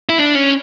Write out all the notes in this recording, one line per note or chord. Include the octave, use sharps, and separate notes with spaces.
E4
D4
C#4